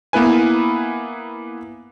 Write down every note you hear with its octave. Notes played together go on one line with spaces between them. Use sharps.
A#3 B3 E4 B4 G#5